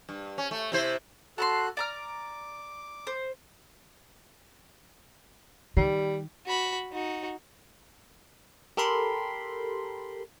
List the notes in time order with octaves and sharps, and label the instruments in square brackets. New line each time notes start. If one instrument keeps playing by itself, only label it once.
[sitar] G2
C#4
A3
C3 E4 C5
[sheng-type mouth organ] F#4 A4 F#6 [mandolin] A5 A#5 C6
[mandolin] D5 A#5 F6 [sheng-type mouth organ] D6
[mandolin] C5
[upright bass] D#3 [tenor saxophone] G3
[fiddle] F#4 B5
D#4 F#4
[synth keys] G4 A4 A#4 B5 C6